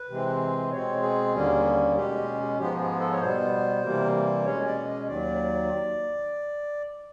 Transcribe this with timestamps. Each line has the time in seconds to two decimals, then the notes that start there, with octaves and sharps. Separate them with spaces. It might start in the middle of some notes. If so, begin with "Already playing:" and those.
Already playing: B4
0.09 C3 E3 G#3 C4
0.72 B2 G#3 C4 C#5
1.03 G#4
1.34 D#2 D3 G3 A#3 C#4
1.96 B2 G#3 C#4 G4
2.59 G#2 F3 G#3 B3 G4
2.79 G#4
3.00 A4
3.12 C#5
3.21 B2 G3 B3 C5
3.83 C3 E3 G3 A#3
4.45 B2 G#3 C#4 C#5
4.66 D5
4.87 D#5
5.08 D#2 D#3 F#3 D5